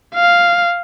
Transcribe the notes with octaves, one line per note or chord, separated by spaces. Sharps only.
F5